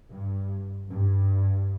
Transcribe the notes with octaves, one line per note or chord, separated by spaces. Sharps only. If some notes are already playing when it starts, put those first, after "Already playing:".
G2
G2